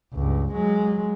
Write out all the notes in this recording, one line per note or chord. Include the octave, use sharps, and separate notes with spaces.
C#2 G2
F#3 G#3